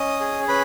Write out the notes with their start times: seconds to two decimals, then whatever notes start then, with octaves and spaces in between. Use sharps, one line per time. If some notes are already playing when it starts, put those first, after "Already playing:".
Already playing: C#4 D#5 D#6
0.21 G#4
0.48 C#4 B4 B5